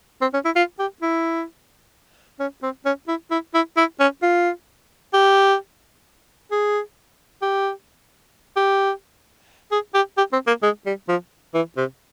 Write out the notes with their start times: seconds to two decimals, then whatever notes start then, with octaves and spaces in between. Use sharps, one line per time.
0.21 C4
0.34 C#4
0.45 E4
0.56 F4
0.79 G4
1.02 E4
2.40 C#4
2.63 C4
2.85 C#4
3.08 E4
3.31 E4
3.54 E4
3.77 E4
4.00 C#4
4.22 F4
5.13 G4
6.52 G#4
7.42 G4
8.56 G4
9.71 G#4
9.94 G4
10.18 G4
10.33 C4
10.47 A#3
10.63 G#3
10.86 G3
11.09 F3
11.54 E3
11.77 C3